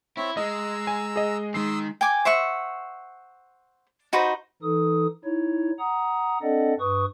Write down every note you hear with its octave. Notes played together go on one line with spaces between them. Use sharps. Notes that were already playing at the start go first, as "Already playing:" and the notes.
C4 E4 C#5 E5
G#3 D#5 A#5 E6
G#5
G#4 D#5
D#3 G#3 C6 D#6 E6 C7
G5 G#5 D6
C5 E5 F#5 C#6
D#4 F#4 B4 C5
E3 D#4 A4 D#6
D#4 E4 C#5
F#5 A#5 D#6
C4 D4 A4 D5 D#5 F#5
G2 B4 C#6 D#6